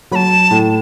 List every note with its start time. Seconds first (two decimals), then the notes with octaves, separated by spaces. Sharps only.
0.12 F#3 B5
0.15 A5
0.51 A2